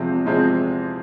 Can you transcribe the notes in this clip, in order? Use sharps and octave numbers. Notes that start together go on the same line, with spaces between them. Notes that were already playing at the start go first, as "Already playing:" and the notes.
Already playing: E2 C3 F3 G#3 C4
E2 C3 F3 G#3 C4